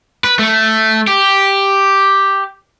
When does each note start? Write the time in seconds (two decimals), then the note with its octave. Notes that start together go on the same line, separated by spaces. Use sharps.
0.24 B4
0.39 A3
1.08 G4